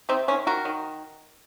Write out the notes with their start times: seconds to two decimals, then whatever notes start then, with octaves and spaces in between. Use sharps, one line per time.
0.09 C3 C4 D#4
0.28 D#3 C#4
0.47 D#3 F#4 A#4
0.65 D#3